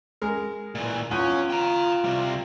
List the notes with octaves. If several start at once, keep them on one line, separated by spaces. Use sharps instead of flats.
G#3 A#4
A#2 E3
E2 C#4 F4
G5 A#5
C3 G3